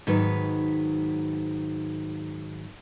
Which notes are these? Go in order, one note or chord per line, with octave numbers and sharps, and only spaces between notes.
G#2 D#3 F#3 B4